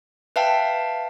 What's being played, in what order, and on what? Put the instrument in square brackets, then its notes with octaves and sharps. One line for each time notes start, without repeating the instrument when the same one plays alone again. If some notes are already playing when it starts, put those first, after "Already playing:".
[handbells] B4 E5 F5 G5 A5